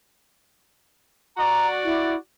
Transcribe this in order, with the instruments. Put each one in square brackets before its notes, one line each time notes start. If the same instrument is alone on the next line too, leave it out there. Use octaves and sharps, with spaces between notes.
[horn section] F#4 D5 [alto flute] A#5
[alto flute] E4